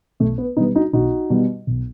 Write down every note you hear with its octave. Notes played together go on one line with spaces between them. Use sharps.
B1 A3
B3
B2 G3 B3 D#4
D#4 F#4
B1 D#4 F#4
B2 G3
B1